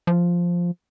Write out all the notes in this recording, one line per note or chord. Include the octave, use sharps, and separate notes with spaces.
F3